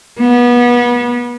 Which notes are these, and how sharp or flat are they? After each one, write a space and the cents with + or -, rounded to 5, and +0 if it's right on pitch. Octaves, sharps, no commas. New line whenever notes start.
B3 -30